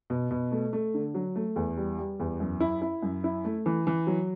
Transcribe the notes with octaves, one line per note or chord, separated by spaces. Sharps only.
B2
B2
A3
A3
D3
F#3
A3
E2
G3
G3
E2
F#2
E4
E4
F#2
E4
A3
E3
E3
F#3